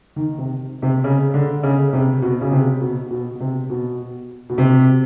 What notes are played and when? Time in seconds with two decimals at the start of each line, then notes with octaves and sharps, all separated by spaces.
0.16 D#3
0.38 C3
0.82 C3
1.04 C#3
1.34 D3
1.63 C#3
1.93 C3
2.22 B2
2.41 C#3
2.52 C3
2.81 B2
3.11 B2
3.40 C3
3.70 B2
4.49 B2
4.58 C3